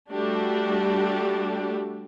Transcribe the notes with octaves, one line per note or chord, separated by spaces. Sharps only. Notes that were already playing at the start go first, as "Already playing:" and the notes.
G3 A3 D4 F#4 G4